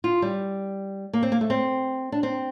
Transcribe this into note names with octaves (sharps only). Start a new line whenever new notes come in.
F4
G3
A#3
C4
A#3
A3
C4
D4
C4